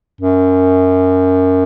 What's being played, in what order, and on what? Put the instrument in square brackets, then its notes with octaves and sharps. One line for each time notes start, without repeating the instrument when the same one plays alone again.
[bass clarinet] F#2